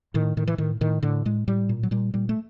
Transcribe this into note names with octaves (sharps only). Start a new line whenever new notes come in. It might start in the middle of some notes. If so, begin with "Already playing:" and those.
A2 D#3
A2 D#3
E3
A2 D#3
A2 D#3
A2 D3
A2 G#3
A2 G3
A#2
F#3
A#2 G3
A#2 G3
A3